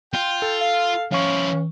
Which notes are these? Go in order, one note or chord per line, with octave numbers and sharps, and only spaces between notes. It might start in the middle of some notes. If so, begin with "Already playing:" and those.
F4 G5
A4
F5
F3 C#4 E4 F5 C#6